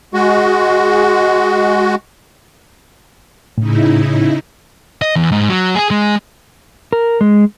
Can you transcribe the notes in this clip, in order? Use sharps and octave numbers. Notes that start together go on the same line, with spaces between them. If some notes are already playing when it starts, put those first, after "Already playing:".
G#3 F#4
A2 C#3 D#4 E4
D#5
E2
G#2
F#3
G#4
G#3
A#4
G#3